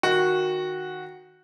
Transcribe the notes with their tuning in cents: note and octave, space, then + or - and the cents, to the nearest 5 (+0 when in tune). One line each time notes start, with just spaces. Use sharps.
D#3 +0 F#4 -10